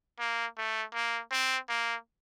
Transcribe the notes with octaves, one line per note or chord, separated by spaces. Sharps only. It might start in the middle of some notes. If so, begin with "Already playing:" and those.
A#3
A3
A#3
C4
A#3